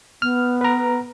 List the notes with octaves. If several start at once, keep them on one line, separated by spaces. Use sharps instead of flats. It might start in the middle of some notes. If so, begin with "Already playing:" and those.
B3 F6
B4 A#5